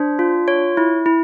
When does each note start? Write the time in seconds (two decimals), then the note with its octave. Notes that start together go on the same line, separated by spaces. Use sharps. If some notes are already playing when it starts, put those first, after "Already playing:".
Already playing: D4 C5
0.19 F4
0.48 C#5
0.77 E4
1.06 E4